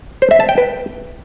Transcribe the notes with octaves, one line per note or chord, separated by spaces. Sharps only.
C5
E5
A5
G5
B4